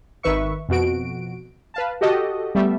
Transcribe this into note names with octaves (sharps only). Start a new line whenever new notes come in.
G#1 D#3 B4 E5 C#6
F2 B2 F#4 D7
B4 F5 A5
F#4 G4 A4 D#5
G3 A3 B3 E5